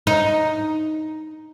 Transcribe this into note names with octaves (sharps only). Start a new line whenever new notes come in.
D#4